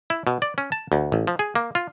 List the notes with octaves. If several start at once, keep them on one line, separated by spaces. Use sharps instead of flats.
E4
B2
D5
C#4
A5
D2
A1
F3
G#4
A#3
F4